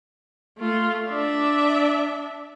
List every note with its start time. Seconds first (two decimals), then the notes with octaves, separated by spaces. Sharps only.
0.58 A3 F4
1.08 D4 E5